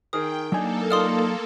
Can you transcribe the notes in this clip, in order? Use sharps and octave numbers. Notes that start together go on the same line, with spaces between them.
D#3 G#4 A#4 G5 D#6
F#3 A#3 D4 D#4 A4 G#5
D#4 F4 D5 C6 D#6 F6